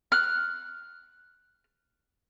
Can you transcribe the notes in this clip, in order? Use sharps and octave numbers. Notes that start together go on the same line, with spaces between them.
F6 F#6